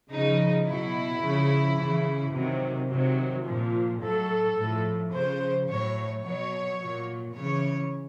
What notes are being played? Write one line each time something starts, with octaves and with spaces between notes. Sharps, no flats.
C#3 F3 D#4
B2 F#3 E4
C#3 F3
C#3 E3
C3 D#3 F#3
C3 D#3 F#3
A#2 F3
A2 F#3 A4
A2 F3
C#3 F3 C5
A2 F#3 C#5
B2 F#3 C#5
A#2 F#3
C#3 E3 C#5